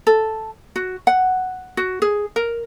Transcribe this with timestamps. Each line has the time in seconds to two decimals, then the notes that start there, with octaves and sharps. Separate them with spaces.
0.07 A4
0.76 F#4
1.07 F#5
1.77 F#4
2.02 G#4
2.36 A#4